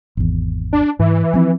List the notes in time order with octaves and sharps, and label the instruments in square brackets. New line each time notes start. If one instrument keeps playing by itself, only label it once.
[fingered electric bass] G#1 E2
[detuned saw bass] D4
[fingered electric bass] G#2 [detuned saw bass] E3
[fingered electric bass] F3 C4